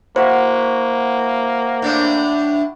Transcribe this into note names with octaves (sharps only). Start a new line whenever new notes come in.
A#3 E4 F#4 C5 E5
A2 D4